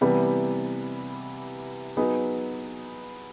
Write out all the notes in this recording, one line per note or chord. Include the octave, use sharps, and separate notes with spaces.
C3 E3 G3 B3
F#3 B3 D#4 G#4